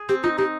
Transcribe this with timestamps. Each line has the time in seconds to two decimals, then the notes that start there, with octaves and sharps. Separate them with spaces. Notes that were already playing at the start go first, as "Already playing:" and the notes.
Already playing: G#4
0.09 C4 G4
0.23 D#4 F4
0.38 D#4 G4